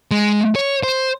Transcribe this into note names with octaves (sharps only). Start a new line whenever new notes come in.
G#3
C#5
C5